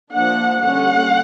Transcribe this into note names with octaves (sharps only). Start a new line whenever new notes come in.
F3 A#3 D4 F#5
D3 G3 A#3 C#4 F#5